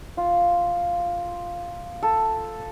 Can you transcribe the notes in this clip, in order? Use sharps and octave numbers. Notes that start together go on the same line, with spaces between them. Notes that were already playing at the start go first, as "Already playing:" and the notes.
F4
A4